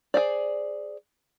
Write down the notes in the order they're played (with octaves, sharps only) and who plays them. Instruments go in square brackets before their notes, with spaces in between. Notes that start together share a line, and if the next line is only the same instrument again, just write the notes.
[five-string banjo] G#4 C5 D5